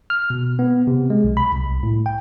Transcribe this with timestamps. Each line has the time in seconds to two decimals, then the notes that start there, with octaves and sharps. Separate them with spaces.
0.10 F6
0.30 B2
0.59 B3
0.87 C3
1.10 G#3
1.24 B1
1.37 B5
1.52 C2
1.83 A2
2.06 G5